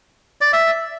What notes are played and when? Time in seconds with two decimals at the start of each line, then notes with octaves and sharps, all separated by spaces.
0.41 D5
0.53 E5